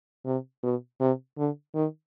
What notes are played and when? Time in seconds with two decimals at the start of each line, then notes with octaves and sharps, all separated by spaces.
0.25 C3
0.63 B2
1.00 C3
1.38 D3
1.75 D#3